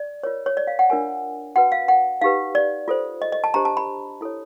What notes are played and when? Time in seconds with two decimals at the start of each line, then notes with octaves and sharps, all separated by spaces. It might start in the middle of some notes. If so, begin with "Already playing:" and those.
Already playing: D5
0.23 F4 A#4 C#5
0.46 C#5
0.57 D5
0.67 F5
0.79 F#5
0.90 D4 F4 A#4 C#5 G#5
1.56 F#4 B4 F#5
1.72 F5
1.88 F#5
2.22 D#4 G4 B4 F5
2.55 D5
2.88 F4 A4 C5
3.22 D#5
3.32 D#5
3.44 A5
3.54 D4 G4 C5 A#5
3.65 A5
3.77 B5
4.21 E4 A4 C#5